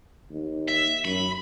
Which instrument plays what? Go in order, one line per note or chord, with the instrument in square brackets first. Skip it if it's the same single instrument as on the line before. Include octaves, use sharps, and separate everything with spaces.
[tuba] D#2
[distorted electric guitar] E5
[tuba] F#2 [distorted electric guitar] B5